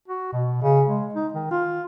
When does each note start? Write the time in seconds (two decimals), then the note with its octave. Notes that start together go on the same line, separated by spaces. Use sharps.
0.08 F#4
0.32 B2
0.62 C#3
0.87 G#3
1.14 D#4
1.33 D#3
1.51 F4